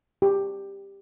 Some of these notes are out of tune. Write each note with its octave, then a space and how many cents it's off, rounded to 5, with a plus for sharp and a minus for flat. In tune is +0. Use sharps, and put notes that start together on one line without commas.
G4 +10